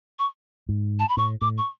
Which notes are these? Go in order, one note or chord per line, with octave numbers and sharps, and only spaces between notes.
C#6
G#2
A5
B5
A2 C#6
A2 D6
C#6